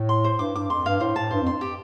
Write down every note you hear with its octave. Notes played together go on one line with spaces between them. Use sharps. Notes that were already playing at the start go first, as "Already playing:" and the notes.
Already playing: A2
C6
C5
G2 D6
G2 D6
F2 C6
G2 F5
A2 C5
A2 A5
G2 C5
F2
G2 C6
G4